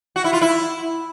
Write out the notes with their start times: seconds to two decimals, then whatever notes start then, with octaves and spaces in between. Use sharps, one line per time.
0.16 F#4
0.24 E4
0.33 F4
0.41 E4